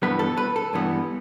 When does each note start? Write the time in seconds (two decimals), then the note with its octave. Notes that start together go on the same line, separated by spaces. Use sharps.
0.02 G2 E3 G3 B3 B4
0.19 A4
0.37 B4
0.56 A4
0.73 G2 E3 G3 B3